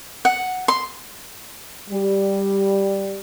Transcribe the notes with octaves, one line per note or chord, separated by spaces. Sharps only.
F#5
C6
G3